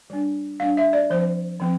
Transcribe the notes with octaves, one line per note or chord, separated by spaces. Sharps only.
G3 D4
G3 D4 F5
E5
D5
F3 C4 C5
F3 C4